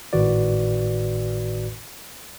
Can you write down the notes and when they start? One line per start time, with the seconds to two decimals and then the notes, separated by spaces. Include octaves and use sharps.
0.13 G#1 A2 D#3 F#4 B4 D5